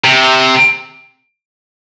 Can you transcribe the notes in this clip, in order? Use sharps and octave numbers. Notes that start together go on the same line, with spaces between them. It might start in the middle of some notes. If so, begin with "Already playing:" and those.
C3